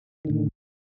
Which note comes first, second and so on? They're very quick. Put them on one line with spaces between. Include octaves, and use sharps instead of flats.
D#3 D3 A2